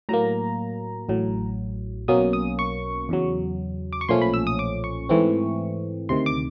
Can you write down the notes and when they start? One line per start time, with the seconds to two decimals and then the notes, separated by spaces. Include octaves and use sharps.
0.09 A2 F#3 A#3 A#5
1.09 A1 A2 F#3
2.08 B1 B2 F#3 A#3 C#4 D#6
2.33 D#6
2.59 C#6
3.09 E2 C#3 F#3
3.93 D6
4.01 C#6
4.09 B1 A#2 F3 A3 C#4 C6
4.21 B5
4.34 E6
4.47 D#6
4.59 D6
4.84 C#6
5.09 G#2 E3 A3 C4
6.09 D2 C3 D#3 C6
6.26 D6